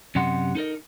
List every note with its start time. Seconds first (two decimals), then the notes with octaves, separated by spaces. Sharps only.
0.15 F#2 C3 G4 D#5 F#5 C6
0.55 D#4 A4 A#4 D#5